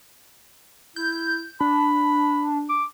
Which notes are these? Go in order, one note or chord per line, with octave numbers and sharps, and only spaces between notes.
E4 G6
D4 B5
D6